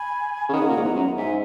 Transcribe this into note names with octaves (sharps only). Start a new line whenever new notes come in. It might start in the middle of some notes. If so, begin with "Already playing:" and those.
Already playing: G#5 B5
C#3
D#3 F#5 A#5
C#3
A#2
G#2
E2
F#2
G#2 E5 G#5